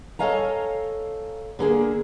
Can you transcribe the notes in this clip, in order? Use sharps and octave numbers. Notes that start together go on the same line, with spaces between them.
A4 C#5 D#5 F5 G#5 A#5
D3 A#3 G#4